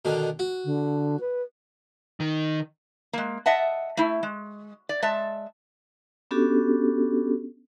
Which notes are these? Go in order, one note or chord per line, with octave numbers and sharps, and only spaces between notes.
B2 D3 D#3
F#4
D3
B4
D#3
G#3 A#3
D#5 E5 F#5 A5
A3 E4
G#3
D5
G#3 E5 A5
B3 C#4 D4 F#4 G4 A4